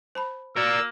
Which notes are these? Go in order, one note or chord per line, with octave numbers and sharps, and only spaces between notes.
C5 A5 B5
A#3 F#4 A#4 D5 E6